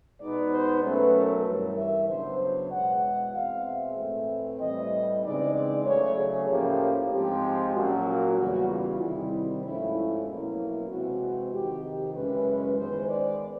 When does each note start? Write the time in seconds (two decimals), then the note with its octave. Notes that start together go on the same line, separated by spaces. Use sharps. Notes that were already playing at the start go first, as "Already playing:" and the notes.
0.20 B2 G#3 B3 D#4 D5
0.51 C5
0.82 B2 F#3 A3 C#4 B4
1.14 A#4
1.45 G2 E3 G3 A#4
1.77 E5
2.08 C#3 F#3 B3 D4 C5
2.40 C#5
2.71 E2 B2 G#3 F#5
3.34 B2 G#3 C4 F5
3.66 E5
3.97 A2 E3 A3 C4
4.60 A2 E3 G3 C4 D#5
5.23 C#3 E3 G#3 C4 D#4 D5
5.54 D5
5.86 C#3 F#3 A3 C#5
6.17 G#4
6.48 A2 F3 A#3 C#4 G4
7.11 G#2 F3 G#3 C4 G4
7.75 A#2 F#3 A#3 C#4 F#4
8.38 E2 C#3 E3 G3 F#4
8.69 F4
9.00 C3 D#3 G3 C4 E4
9.63 G#2 F3 A3 C#4 E4
9.95 E4
10.26 B2 F#3 A#3 C#4 E4
10.58 E4
10.89 C3 E3 G#3 C4 F#4
11.53 F2 C3 D#3 G4
11.84 G4
12.15 F#2 C#3 E3 G#3 C#4 B4
12.78 D#3 G#3 B3 C5
13.10 D5